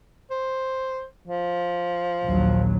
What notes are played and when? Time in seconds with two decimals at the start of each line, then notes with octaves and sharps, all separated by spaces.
0.31 C5
1.27 F3
2.23 A#1 D#2 F#3